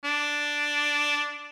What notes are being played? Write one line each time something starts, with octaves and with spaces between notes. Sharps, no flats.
D4